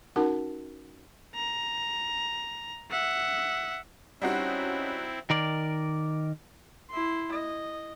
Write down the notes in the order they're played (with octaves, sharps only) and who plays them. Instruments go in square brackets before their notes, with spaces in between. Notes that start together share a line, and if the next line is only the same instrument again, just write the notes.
[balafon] C#4 D#4 F#4 A#4 F#5 A5
[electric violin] A#5
E5 F#5
[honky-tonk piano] G3 D#4 F#4 [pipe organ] C4 E4 [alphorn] C#4 [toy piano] F#5 B5
[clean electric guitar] D#3 A#4 D5
[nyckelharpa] E4 C6
D#5